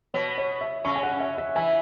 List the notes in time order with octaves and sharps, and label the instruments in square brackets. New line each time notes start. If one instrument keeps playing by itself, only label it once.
[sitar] B2 B3 [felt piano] C#5
[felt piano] C#5
E5
[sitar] C#3 C#4 [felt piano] C#6
[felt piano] G#5
F#5
E5
E5
[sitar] E3 E4 [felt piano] G#5